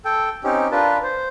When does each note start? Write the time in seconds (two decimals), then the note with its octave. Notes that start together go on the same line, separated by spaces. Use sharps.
0.05 A4 G5
0.44 C4 C#4 D#4 G4
0.72 D4 F4 A#4 B4 A5
1.03 C5